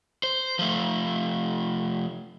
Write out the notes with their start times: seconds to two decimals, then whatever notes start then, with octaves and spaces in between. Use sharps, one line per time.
0.23 C5
0.59 F3 A3